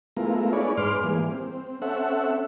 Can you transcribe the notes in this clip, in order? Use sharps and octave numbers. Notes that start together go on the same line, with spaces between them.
G#3 A3 B3 E4 F4 A#4
D#4 G#4 B4 C#5 D5
G#2 G#3 B4 C6 D6 F6
E3 G3 A#3 G#4
C4
C4 C#4 A4 E5 F#5